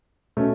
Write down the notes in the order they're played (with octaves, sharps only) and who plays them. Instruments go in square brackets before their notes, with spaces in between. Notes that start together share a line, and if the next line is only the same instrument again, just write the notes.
[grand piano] B2 A3 C#4